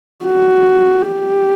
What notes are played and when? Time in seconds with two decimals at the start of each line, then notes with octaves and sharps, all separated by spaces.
0.25 F#4
1.12 G4